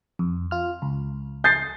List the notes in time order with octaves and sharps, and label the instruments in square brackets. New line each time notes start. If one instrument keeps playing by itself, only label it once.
[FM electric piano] F2
F4 F6
C#2
[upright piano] G6 A6 C7